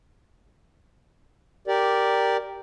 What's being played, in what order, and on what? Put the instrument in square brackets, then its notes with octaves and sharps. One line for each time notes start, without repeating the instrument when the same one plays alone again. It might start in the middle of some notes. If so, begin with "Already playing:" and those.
[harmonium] G4 A#4 D5